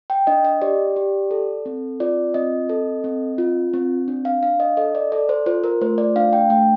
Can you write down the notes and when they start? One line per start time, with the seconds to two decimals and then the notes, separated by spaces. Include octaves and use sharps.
0.10 G5
0.27 D4 D#5
0.45 D#5
0.62 G4 D5
0.96 G4
1.31 A4
1.66 C4
2.00 F4 D5
2.34 C4 D#5
2.69 A4
3.04 C4
3.38 F4
3.74 C4
4.08 D4
4.25 F5
4.43 D4 F5
4.60 D#5
4.77 A4 D#5
4.95 D5
5.12 A4 D5
5.29 C5
5.46 F4 C5
5.64 A#4
5.81 A3 C5
5.98 D5
6.16 D4 F5
6.33 G5
6.50 A3 G5